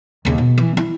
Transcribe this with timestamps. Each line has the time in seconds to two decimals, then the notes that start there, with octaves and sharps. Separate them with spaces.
0.25 D#2 C#3
0.38 B2
0.58 E3
0.77 E4